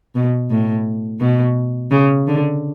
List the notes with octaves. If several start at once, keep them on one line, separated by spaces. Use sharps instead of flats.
B2
A2
B2
C#3
D3